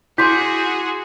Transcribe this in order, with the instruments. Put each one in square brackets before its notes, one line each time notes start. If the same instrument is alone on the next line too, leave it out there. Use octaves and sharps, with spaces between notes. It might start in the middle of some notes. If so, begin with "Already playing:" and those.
[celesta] E4 G6 B6 [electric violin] F#4 G#4 [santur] C6 D6